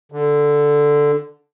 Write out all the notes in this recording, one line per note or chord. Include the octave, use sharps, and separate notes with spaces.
D3